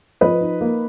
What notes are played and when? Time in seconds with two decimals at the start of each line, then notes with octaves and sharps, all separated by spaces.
0.21 F3 B4 D#5
0.41 D#4
0.61 A#3